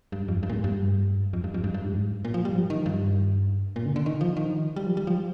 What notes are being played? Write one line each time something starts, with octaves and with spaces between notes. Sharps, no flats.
G2
F2
G2
A#2
G#2
G2
F2
G2
F2
G2
G2
G#2
A#2
F3
G3
F3
D#3
G2
A#2
D3
D3
D#3
F3
D#3
G3
F3
G3
F3